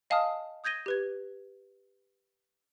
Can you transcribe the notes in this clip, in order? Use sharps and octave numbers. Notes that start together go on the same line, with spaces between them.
D#5 F5 G#5 A5 D#6 F6
D#6 G6 G#6 A#6 D#7 G7
G4 B4 G#6